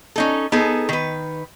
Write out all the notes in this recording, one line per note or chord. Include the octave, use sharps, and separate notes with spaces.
C#4 D#4 A4
B3 D#4 G#4 A4
D#3 B4